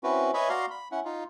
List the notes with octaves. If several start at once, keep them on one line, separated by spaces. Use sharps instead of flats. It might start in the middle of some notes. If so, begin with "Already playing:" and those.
C4 C#4 E4 F#4 B4
B4 C#5 D#5 E5 G#5 B5
F#4 D5 F5 A#5 C6
B5
C#4 E4 F#5
D#4 F4